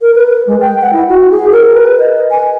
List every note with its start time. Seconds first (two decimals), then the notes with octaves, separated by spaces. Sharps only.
0.01 A#4
0.15 B4
0.47 G#3
0.61 G5
0.82 F#5
0.93 E4
1.08 F#4
1.31 G#4
1.52 A#4
1.75 B4
1.99 D#5
2.31 G#5